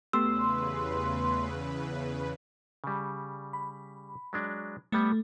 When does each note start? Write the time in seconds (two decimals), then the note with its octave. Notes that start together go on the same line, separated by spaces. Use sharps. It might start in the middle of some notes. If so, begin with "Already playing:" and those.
0.13 E2 C#3 A3 B3 G4 B4 C6 E6
2.84 C#3 G3
3.53 B5
4.33 F#3 G#3 D4
4.92 G3 A3 B3 A4